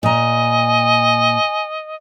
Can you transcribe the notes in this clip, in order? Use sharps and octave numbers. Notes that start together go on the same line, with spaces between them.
A#2 D#5 G#5 A#5